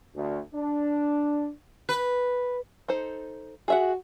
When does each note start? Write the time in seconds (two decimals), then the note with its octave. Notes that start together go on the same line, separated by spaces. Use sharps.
0.15 D2
0.54 D4
1.89 B4
2.88 D#4 A4 C5
3.68 F#4 G#4 E5 F#5